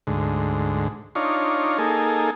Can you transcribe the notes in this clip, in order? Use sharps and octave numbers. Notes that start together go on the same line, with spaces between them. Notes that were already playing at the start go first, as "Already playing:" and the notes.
D2 G#2
D4 D#4 F4 C#5
A#3 D#4 G#4 A4